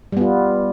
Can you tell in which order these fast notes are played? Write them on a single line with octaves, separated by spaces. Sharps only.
G3 B3 F4